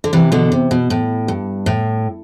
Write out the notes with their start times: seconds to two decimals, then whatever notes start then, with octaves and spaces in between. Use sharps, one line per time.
0.04 D3
0.13 C3 E3
0.32 B2 D3
0.52 C3
0.71 B2
0.90 A2
1.28 G2
1.66 A2